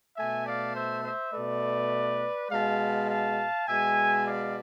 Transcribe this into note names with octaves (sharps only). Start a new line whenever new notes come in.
B2 A3 E5 G#5
D5 F5
C5 E5
C5 E5
B2 A3 B4 D5
B2 G#3 F5 A5
F5 A5
B2 G#3 E5 G#5
D5 F5